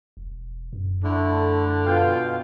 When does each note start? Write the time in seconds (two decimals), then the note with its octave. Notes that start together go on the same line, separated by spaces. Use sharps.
0.17 E1
0.73 F#2
1.04 D3 A3 E4
1.86 B2 F4 F5 G5